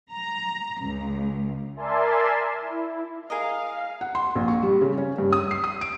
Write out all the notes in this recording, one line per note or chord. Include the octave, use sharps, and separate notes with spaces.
A#5
C#2
A#4 D5 E5 G#5 A5 C6
E4
G#4 A#4 D#5 F5
F#5
C6
A#1
C#6
G3
C#3
C#4
G2
D#6
C7
D#6
D7